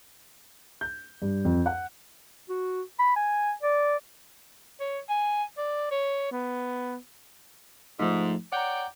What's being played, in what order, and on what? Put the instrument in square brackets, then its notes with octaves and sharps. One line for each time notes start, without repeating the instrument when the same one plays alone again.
[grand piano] G6
G2
F2
F#5
[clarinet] F#4
B5
G#5
D5
[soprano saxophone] C#5
G#5
D5
C#5
B3
[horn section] G#2 [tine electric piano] F3 A3 D#4
[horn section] C#5 D5 G5 [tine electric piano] F#5 A#5